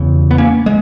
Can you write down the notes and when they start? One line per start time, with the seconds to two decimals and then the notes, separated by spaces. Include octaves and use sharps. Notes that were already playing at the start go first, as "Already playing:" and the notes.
Already playing: E2 C#3
0.31 B3
0.38 A#3 C#4
0.66 G#3